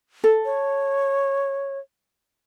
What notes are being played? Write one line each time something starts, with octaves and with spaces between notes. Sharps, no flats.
A4
C#5